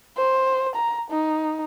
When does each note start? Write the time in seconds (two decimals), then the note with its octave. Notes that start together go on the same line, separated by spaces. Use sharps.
0.17 C5
0.75 A#5
1.10 D#4